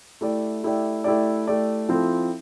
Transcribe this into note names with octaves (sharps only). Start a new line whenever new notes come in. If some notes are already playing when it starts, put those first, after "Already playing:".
A3 E4 G4 D5
A3 E4 G4 D5
A3 E4 G4 D5
A3 E4 G4 D5
F3 C4 E4 A4